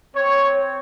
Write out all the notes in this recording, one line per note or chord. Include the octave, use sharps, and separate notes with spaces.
C4 C#5